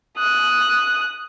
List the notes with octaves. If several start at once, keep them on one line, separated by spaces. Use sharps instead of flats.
D#6 F#6